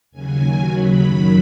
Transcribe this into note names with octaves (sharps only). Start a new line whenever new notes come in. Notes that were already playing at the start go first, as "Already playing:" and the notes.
D#2 C#3 F#3 G#5
D#2 D#3 F#3
D#2 C#3 F#3 B5
F#2 D#3 F#3 B5